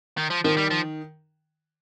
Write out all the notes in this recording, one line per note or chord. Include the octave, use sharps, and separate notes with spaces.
D#3
F3
D#3 F3
G3
F3